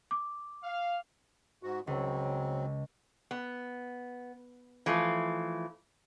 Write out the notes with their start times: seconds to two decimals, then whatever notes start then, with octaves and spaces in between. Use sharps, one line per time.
0.11 D6
0.64 F5
1.63 G#2 F#4
1.87 C#2 F#3 C4
3.31 B3
4.86 E3 F3 A3 F4